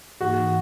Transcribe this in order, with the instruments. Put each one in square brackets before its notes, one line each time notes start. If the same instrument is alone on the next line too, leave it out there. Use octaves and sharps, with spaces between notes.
[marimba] G#2 E3 A#3 D#4 [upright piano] F#4